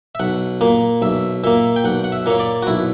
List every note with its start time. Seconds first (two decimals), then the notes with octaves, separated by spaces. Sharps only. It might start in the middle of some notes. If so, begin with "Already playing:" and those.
0.15 E5
0.20 B1 F#5
0.61 A#2 A#3
1.02 B1 E5
1.44 A#2 A#3 E5
1.76 G5
1.85 B1 F#5
2.04 F#5
2.12 E5
2.26 A#2 A#3 C#5
2.40 D5
2.62 F#4
2.67 B1 E4